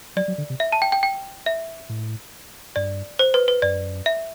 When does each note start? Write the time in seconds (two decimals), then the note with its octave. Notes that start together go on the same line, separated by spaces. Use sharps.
0.16 F#3 D5
0.28 F#3
0.38 D3
0.50 C3
0.60 E5
0.72 A5
0.82 G5
0.92 G5
1.03 G5
1.46 E5
1.89 A2
2.76 G2 D5
3.19 C5
3.34 B4
3.48 B4
3.62 F#2 D5
4.06 E5